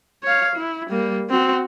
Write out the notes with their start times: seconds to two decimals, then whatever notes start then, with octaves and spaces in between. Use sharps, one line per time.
0.23 C#5 F5
0.56 E4
0.90 G3 A#3
1.30 C4 F#4